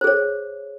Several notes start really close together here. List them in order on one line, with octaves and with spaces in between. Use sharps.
C5 G#4 C#5